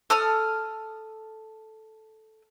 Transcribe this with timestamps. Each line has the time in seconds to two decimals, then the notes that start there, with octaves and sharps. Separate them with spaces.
0.10 A4 D#6 F6